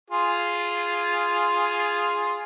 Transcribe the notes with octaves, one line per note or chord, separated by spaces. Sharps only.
F4 G#4